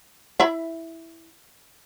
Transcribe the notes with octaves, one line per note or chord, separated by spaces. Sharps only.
E4 E5 B5